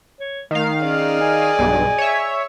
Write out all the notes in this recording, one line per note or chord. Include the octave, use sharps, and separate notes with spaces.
C#5
D#3 A3 F5
C#4 G#4 D5 D#5
G#5
B1 G2
C#5 E5